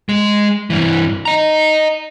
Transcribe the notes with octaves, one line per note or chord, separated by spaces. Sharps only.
G#3
G2 E3
D#5 A#5